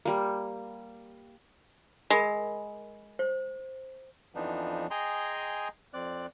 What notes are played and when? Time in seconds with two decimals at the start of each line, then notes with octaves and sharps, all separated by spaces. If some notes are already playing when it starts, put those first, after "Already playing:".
0.05 G3 A#3
2.10 G#3 A#4 B5
3.19 C5
4.35 F2 E3 F3 B3 D4 D#4
4.91 G#4 D#5 G5 G#5 A#5 C6
5.94 F2 C4 D5 F#6